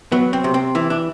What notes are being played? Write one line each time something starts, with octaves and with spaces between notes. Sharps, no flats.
F#3 B3
C4
C3
C4
E3 E4
D4